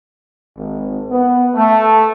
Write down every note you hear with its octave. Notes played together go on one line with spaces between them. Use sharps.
G#1
B3
A3